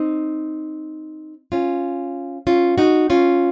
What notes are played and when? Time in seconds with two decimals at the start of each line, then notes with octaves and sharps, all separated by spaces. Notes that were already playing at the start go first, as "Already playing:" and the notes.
Already playing: C4 D#4
1.52 C#4 F4
2.47 C#4 F4
2.78 D#4 F#4
3.10 C#4 F4